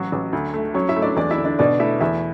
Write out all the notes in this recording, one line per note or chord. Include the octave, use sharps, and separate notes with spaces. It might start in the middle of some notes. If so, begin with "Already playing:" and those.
Already playing: A1 F#3 F#4
A1
D2
A3
F#3 C#4 C#5
E4 E5
A3
D4 D5
E2 D4 D5
E4 E5
D3
D4 D5
B2 D4 D5
A3 E4 E5
E2 E4 E5